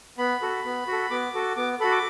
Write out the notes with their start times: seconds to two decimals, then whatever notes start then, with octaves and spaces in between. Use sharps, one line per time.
0.18 B3 B5
0.42 F#4 A4
0.65 B3
0.87 F#4 A4
1.11 B3 D6
1.34 F#4 A4
1.57 B3 D6
1.80 F#4 A4 B5
1.91 D6